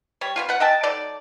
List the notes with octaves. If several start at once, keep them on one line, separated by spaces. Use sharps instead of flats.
G3 C#5
B3 C#4 F4
B3 F#5
D#5 E5 G5 A5
F#3 D#4 A4 D5